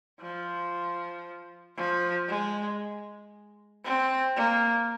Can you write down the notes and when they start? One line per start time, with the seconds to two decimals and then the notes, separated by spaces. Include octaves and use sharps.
0.21 F3
1.77 F3
2.29 G#3
3.84 C4
4.36 A#3